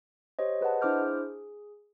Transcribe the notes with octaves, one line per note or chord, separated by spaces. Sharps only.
G4 C5 C#5 D#5
G#4 B4 D#5 F#5 A5
D4 E4 C5 D6 F6 G6
G#4